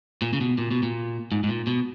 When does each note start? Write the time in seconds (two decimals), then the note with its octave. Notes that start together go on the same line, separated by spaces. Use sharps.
0.22 A#2
0.33 C#3
0.41 B2
0.58 A#2
0.71 B2
0.83 A#2
1.32 G#2
1.44 G#2
1.49 A#2
1.67 B2